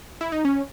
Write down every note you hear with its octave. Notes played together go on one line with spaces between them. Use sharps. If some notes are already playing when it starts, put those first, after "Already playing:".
E4
D#4
C#4